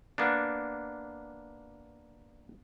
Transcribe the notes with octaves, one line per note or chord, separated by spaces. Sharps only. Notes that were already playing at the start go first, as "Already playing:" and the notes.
A#3 B3 D4